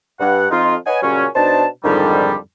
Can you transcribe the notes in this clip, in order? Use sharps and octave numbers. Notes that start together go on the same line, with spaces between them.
G2 F#5
F2 D#4 F4
B4 C#5 D#5 F#5 G#5
A#2 C#3 F#3 G3 C#4
B2 D4 D#4 C5 A5
F2 G#2 D3 D#3 F3 G3